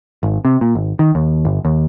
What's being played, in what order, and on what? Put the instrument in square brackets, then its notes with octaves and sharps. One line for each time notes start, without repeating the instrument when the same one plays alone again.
[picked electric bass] G#1
C3
A#2
G#1
D#3
D#2
G1
D#2